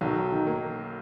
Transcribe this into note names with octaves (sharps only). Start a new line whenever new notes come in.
B1 D#3 F#3
D#3
A#3